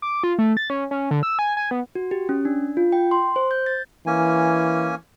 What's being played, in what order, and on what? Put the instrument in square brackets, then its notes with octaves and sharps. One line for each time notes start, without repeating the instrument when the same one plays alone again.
[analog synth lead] D6
F4
A3
A6
C#4
C#4
D3
E6
G#5
G#5
B3
[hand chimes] F#4
G4
C#4
D4
F4
G5
C6
C5
G6
A6
[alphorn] E3 [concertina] A#3 C#4 G#5